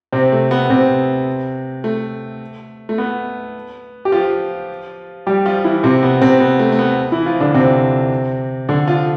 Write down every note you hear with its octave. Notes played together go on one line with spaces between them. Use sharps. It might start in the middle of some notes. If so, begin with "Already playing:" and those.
C3 C4
A3
B3
C3 C4
A3
A3
B3
G4
F3 F4
G3 G4
F3 F4
E3 E4
C3 C4
B3
C3 C4
B3
A3
A3
B3
E3 E4
F3 F4
D3 D4
C3 C4
D3 D4
F3 F4